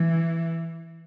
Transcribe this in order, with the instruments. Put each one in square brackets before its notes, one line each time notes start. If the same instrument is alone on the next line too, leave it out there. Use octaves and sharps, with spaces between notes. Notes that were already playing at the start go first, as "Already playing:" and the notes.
Already playing: [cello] E3